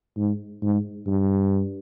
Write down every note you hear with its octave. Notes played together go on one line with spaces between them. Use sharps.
G#2
G#2
G2